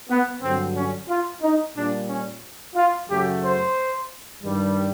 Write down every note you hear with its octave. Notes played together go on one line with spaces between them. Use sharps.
B3
G2 D3 F#3 C4
C#4
F4
D#4
A#2 G3 D4
C#4
F4
F#2 C#3 F#3 A3 G4
C5
G2 D#3 G3